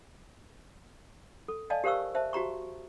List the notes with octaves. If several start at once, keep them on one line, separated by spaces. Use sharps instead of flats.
A4
D5 D#5 F5 G#5 A5
G4 A#4 C5 F5 C#6 E6
C5 E5 A5
F#4 G4 A#5 C#6